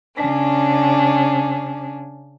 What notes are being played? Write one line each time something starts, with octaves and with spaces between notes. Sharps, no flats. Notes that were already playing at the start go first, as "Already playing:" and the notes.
C#3 C#4 D4